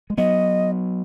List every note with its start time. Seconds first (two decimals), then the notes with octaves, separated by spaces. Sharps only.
0.10 G#3
0.18 F#3 B3 D#5